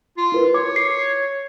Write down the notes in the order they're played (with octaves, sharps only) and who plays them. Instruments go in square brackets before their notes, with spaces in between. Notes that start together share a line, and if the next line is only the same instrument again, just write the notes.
[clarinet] F4
[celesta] E4 A#4 B4
[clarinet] C#5 [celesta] D6
[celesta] C7